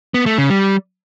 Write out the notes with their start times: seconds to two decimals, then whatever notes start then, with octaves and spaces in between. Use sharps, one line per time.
0.14 B3
0.26 A3
0.38 C#3
0.50 G3